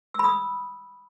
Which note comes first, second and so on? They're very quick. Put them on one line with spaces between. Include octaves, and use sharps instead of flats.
E6 B5 D#6